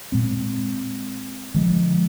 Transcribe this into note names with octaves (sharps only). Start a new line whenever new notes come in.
A#2 G#3 C4
D3 F3 G#3